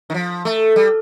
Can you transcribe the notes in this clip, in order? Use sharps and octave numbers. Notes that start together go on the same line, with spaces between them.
D#3
F3
A3
G3